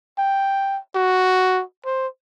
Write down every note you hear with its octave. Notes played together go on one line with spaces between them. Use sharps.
G5
F#4
C5